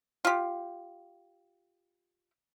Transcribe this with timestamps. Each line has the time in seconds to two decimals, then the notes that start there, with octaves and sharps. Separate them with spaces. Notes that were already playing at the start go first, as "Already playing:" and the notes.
0.25 F4 G4